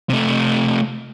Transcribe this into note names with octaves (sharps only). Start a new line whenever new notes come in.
C3 A3